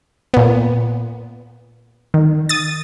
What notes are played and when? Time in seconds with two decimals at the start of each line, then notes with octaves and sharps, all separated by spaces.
0.34 A#2 B3
2.14 D#3
2.49 D#6 A6